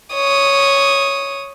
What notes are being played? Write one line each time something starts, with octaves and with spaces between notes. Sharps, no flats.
C#5 D#6